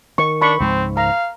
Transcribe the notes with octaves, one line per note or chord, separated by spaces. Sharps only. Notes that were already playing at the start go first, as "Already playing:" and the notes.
D#3 C#6
D4 B5 C#6
C#2 G#2 F3 C4
F5 A#5